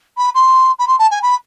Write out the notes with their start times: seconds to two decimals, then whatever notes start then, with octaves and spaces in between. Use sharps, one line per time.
0.17 B5
0.34 C6
0.79 B5
0.87 C6
0.98 A5
1.10 G#5
1.22 B5